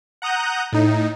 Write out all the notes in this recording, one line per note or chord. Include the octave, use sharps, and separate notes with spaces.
F#5 A#5 D#6 F#6 G6
A2 D#4